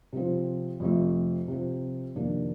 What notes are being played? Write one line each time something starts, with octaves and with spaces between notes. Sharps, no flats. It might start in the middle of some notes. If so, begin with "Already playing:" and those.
C3 F3 C4
F2 C3 F3 A3
C3 F3 C4 F4
F2 C3 D#3 A#3 D4